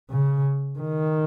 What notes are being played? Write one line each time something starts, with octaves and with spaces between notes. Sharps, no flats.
C#3
D#3